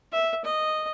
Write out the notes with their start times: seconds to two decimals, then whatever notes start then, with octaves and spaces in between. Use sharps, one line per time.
0.12 E5
0.44 D#5